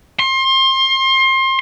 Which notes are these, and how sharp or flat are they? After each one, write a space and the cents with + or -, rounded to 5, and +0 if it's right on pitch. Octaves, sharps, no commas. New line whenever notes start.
C6 +30